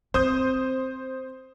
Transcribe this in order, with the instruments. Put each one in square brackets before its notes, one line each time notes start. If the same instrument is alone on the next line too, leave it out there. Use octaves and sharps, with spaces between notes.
[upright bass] C4 [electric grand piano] C5 D#6 G6